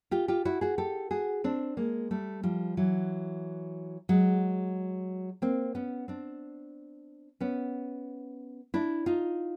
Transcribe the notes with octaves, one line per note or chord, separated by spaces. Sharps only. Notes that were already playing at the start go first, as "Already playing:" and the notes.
F4 G4
F4 G4
E4 F#4
F#4 G#4
G4 A4
F#4 G#4
C4 D4
G#3 A#3
G3 A3
F3 G3
E3 F#3
F#3 G#3
A#3 C4
B3 C#4
C4 D4
B3 C#4
D4 E4
D#4 F4